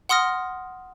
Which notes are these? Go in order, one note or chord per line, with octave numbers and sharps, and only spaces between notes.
F#5 C6 D#6 F6 A#6